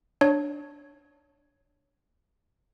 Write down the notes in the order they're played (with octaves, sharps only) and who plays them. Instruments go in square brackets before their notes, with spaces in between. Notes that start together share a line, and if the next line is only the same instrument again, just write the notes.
[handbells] D4 C#5